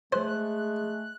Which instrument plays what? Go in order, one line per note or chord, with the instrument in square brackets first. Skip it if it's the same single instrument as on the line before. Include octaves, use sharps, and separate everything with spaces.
[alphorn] G#3 [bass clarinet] A3 [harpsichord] C5 [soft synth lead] F#6